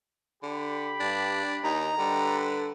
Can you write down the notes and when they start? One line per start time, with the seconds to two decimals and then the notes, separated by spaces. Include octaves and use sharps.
0.43 D3 G4 B5
1.00 G2 D4
1.64 D#2 D#4 A#5
1.98 D3 G3 A4 B4